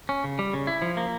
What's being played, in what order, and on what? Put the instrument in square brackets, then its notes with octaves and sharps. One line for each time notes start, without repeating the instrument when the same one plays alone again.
[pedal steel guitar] C#4
C#3
G3
C#3
E4
F3
A#3